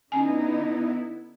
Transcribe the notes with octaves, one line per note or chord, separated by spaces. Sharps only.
D3 B3 C#4 D#4 E4 G#5